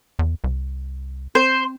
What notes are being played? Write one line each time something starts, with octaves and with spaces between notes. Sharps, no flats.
E2
C2
C4 C5